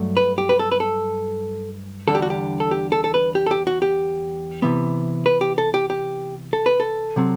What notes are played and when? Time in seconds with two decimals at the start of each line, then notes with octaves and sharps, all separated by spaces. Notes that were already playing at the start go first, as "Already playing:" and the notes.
Already playing: G2 F#3 A3
0.17 B4
0.38 G4
0.49 B4
0.59 A4
0.72 B4
0.80 A4
2.08 E2 D3 G3 D4 A4
2.15 G4
2.22 F#4
2.30 G4
2.60 A4
2.71 G4
2.92 A4
3.04 A4
3.14 B4
3.35 G4
3.46 A4
3.51 G4
3.67 F#4
3.82 G4
4.62 C3 E3 B3
5.26 B4
5.41 G4
5.58 A4
5.74 G4
5.90 G4
6.53 A4
6.66 B4
6.80 A4
7.16 C3 F#3 C4